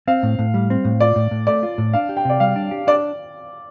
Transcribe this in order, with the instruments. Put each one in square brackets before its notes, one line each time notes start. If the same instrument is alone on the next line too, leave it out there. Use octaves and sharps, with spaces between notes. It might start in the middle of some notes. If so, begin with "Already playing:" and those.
[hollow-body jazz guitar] C4 [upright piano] F5
[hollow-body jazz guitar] A2
A2
G3
C4
A2
[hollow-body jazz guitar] F4 [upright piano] D5
[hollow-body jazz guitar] A2
A2
[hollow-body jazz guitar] A3 [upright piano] D5
[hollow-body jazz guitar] F4
A2
[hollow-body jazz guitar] D4 [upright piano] F5
[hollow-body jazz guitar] G4
[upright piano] G5
[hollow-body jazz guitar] C3 [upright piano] D5
[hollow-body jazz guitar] G3 [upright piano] F5
[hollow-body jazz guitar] D4
G4
[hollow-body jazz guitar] D4 [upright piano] D5